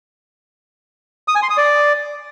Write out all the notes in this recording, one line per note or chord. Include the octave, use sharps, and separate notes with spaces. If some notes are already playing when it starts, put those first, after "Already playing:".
D#6
G#5
C6
D#6
D5